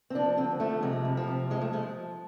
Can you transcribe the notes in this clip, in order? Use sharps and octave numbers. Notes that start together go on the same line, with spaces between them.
C4
F3 D4
D3 C4
F3 A3
C3 G#3
F2
F3
C3
F3 G#3
A3
F3 G#3